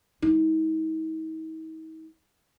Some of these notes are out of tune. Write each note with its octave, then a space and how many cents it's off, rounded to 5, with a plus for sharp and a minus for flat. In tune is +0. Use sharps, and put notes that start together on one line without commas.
G#3 -45 D#4 +45